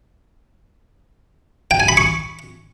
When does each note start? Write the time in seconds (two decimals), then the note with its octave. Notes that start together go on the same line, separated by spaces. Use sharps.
1.71 G5
1.80 G#5
1.88 B5
1.97 C#6